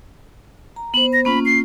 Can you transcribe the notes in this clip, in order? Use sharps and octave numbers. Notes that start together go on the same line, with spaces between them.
A#5
B3 C5 F#7
A#6
A#3 C#4 F4 B5
C7